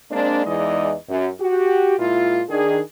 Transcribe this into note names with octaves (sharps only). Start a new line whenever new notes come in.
G#3 A#3 C4 D4
E2 E3 G#3 D#4 D5 D#5
F#2
F#4 G4
A#2 G#3 E4 F4
D#3 D4 G#4